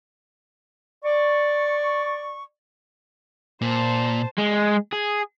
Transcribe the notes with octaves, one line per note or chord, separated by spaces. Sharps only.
D5 C#6
A#2 C5 A5
G#3
G#4